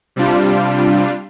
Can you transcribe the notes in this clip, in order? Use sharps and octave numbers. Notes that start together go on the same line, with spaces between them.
C3 G3 D4 F4